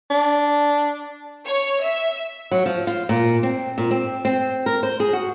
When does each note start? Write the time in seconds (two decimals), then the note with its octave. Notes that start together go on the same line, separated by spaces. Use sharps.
0.10 D4
1.46 C#5
1.83 E5
2.51 F#3
2.66 F3
2.87 F4
3.09 A#2
3.43 C4
3.78 A#2
3.91 C4
4.25 C4
4.66 A#4
4.83 C5
5.00 G#4
5.13 F#4